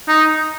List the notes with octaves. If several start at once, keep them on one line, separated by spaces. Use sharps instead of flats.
D#4